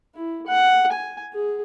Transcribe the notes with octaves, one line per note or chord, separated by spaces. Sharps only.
E4
F#5
G#5
G#4